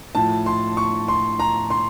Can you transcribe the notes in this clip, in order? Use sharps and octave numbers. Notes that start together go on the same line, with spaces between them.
A2 F3 A5
C6
C#6
C6
A#5
C6